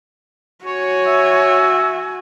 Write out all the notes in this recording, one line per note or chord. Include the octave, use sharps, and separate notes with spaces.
F#4 C#5 G#5
E5